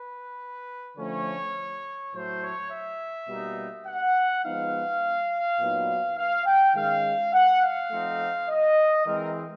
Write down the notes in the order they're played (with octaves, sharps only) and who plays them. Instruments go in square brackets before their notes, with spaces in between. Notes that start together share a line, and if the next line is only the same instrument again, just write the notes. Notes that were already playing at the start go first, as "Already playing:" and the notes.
Already playing: [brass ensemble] B4
D3 F3 A3 C#4 C#5
A2 F#3 A3 C5
C#5
E5
B2 G3 A#3 D#4
F#5
F3 G#3 B3 D#4 F5
A#2 F#3 B3 D#4
F5
G5
D#3 G#3 C#4 F5
F#5
F5
F3 A3 C4 D#4
D#5
E3 G#3 C4 A#4